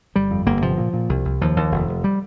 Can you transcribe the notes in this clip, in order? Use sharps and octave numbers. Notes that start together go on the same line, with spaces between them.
G1 G3
F2
G1 A#3
C3 F3
A#2
A#2
C2
C2
D#2 F3
D#2
F1
F1
G3